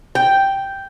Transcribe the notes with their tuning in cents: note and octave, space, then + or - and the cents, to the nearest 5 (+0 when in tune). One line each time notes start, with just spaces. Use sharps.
G5 +0